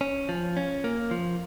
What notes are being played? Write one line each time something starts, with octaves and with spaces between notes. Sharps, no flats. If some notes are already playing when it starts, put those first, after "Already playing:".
C#4
F3
C#4
A#3
F3